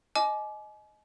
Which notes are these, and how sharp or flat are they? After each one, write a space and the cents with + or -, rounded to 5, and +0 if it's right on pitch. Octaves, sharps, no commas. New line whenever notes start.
D#5 +0 G#5 +40 D6 +0